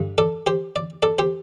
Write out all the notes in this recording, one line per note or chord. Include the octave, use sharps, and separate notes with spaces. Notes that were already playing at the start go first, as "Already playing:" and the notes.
Already playing: G2 D3
A4 D5
G4 C5
D5
A4 D5
G4 C5